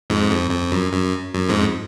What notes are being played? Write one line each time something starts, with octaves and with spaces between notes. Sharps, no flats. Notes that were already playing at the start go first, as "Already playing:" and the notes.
F2 G#2
F2
F2
F#2
F#2
F#2
F2 G#2